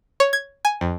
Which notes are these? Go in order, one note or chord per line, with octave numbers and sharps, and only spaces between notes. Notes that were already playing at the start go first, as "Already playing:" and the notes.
C#5
G#6
G#5
F2